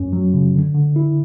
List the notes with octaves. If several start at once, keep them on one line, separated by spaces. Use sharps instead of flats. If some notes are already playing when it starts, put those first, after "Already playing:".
Already playing: F#2 C#4
F#3
C#3
D3
D3
E4